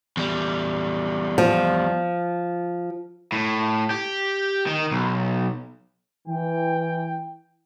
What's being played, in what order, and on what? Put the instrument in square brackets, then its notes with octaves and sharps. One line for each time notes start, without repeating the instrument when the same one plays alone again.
[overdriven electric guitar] E2 G3
[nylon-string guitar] F3
[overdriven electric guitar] A2
G4
D#3
B1
[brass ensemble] E3 G5